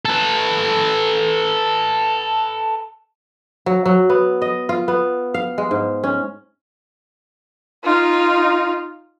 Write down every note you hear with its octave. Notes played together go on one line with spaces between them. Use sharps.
A4 B4
F#3
F#3
B3
D#5
F4
B3
F5
G#3
G#2
C#4
D#4 F4